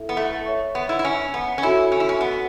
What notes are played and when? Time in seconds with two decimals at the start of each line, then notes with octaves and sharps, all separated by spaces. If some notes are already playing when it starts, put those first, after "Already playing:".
Already playing: E4 A4 E5
0.09 B3
0.17 A3
0.46 C#5 E5 C#6
0.75 B3
0.89 E4
0.99 E4
1.04 C#4
1.34 B3
1.58 C#4
1.62 E4 F#4 A4 C#5 E5 B5
1.92 C#4
2.00 E4
2.09 C#4
2.21 B3